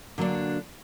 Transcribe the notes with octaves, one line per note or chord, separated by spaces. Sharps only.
D3 F#3 A#3 D4